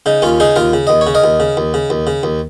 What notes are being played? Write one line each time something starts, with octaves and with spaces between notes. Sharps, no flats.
C#3 D#4
D#2 C#4 F4
C#3 D#4 G#4
D#2 F4 A#4
C#3
D#2 D#5
C#5
C#3
A#4 D#5
D#2
C#3
D#2
C#3
D#2
C#3
D#2